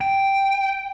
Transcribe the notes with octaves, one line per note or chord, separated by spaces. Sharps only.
G5